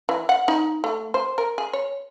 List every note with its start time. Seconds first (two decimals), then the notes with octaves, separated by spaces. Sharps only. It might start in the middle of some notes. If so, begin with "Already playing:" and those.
0.09 E3
0.29 F#5
0.48 D#4
0.84 A3
1.14 C5
1.38 A#4
1.58 G#4
1.73 C#5